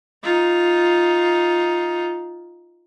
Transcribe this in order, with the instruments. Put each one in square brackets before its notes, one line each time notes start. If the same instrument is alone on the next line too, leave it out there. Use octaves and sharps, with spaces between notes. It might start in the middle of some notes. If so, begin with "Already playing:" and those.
[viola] D#4 F4